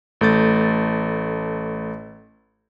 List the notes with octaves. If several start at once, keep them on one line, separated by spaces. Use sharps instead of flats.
A1 A3 G6 A6